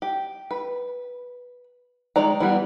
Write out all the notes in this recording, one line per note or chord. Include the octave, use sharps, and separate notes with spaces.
G4
B4
D#3 G#3 D5 A#5
E3 G3 B3